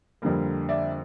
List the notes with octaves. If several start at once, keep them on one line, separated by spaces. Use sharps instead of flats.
F2 D3 G3 A#3
D5 E5